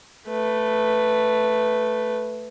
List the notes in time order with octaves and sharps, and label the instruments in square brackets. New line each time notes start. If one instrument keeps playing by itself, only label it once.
[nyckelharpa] A3 B4